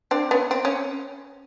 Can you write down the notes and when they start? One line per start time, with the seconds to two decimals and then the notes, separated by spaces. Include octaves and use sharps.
0.11 C4 D4
0.31 B3 C#4
0.51 C4
0.65 C#4